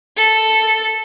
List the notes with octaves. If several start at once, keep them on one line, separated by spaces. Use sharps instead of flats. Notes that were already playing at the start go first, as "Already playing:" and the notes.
A4